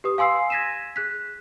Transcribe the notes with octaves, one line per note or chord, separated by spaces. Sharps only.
G4 B4 D#6
F5 G#5 C6 E6 C7
G#6 A#6 B6 D#7 E7
G#4 F#6 B6